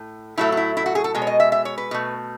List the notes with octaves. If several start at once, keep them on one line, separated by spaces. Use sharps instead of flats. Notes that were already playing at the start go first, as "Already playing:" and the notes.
Already playing: A2
A2 F#3 A3 E4
F#4
E4
E4
F#4
G#4
A4
B2 G#3
C#5
D#5
E5
E5
C#5
B4
B2 A3